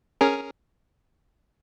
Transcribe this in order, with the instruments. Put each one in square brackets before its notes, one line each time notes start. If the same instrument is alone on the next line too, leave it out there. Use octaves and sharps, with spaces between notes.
[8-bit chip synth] C#4 G#4 A#4